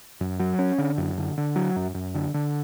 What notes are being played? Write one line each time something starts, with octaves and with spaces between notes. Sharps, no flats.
F#2
F#3
C#4
D3
F#2
D3
D3
F#3
F#2
F#2
D3
D3